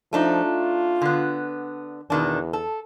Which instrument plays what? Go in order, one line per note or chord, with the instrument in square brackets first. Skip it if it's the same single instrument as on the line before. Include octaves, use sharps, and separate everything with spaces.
[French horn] F3 [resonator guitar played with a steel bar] A3 D4 D#4
[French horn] F4
[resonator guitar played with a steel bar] D3 B3
[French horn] E2 [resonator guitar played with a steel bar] B2 D#3 D4
[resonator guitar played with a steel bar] A4